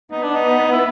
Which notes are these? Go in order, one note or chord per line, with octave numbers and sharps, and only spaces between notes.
B3 D#4
D4
D#4
E4